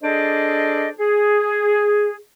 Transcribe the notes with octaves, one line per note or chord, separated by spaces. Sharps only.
D4 G#4 A4 C5 D5 D#5
G#4